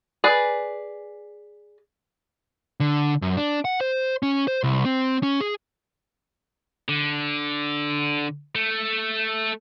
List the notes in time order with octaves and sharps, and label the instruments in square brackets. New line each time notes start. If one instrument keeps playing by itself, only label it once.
[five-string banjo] G#4 B4 D5
[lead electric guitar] D3
F#2
D4
F#5
C5
C#4
C5
C2
C4
C#4
G#4
[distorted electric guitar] D3
A3